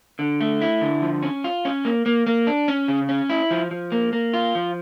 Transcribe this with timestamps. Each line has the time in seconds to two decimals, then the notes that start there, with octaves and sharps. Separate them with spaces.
0.19 D3
0.41 A3
0.61 E4
0.82 D3
1.02 F3
1.23 C#4
1.44 F4
1.65 C#4
1.85 A#3
2.06 A#3
2.27 A#3
2.47 D4
2.68 C#4
2.88 C#3
3.09 C#4
3.30 E4
3.51 F3
3.71 F3
3.92 A#3
4.13 A#3
4.34 F4
4.55 F3